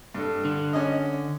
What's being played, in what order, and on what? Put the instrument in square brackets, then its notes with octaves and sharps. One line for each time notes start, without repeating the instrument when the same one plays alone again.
[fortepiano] G2 A4
[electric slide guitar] D3
[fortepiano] C#4 D#5